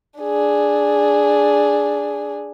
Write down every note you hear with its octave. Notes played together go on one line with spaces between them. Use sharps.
D4 G#4